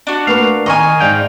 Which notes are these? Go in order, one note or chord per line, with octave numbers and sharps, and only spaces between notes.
D4 F#4
A3 A#3 B4 F5 C#6
D#3 D#5 G#5 A#5 C#6 F6
G#2 D5 F5 G5